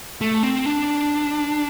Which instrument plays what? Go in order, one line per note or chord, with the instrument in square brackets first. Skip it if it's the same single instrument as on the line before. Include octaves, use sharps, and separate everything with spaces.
[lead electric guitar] A3
C4
D4